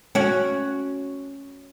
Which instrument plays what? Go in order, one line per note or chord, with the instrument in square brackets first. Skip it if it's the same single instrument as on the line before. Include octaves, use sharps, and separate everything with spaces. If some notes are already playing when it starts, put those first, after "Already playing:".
[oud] C#4 F#4